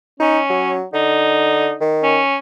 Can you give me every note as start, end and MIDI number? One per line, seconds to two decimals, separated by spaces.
0.20 0.77 61
0.20 0.40 63
0.50 0.84 54
0.93 1.74 50
0.93 1.77 63
1.81 2.19 51
2.03 2.37 61